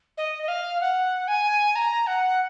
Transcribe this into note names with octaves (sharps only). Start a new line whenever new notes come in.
D#5
D#5
F5
F#5
G#5
A#5
F#5